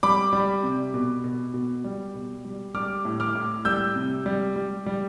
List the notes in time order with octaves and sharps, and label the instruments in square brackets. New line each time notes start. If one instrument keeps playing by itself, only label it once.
[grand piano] G3 B5 D6
G3
C3
B2
B2
B2
G3
B2
G3
G3 D6 F6
A2
D6 F6
A2
G3 E6 G6
C3
G3
G3
G3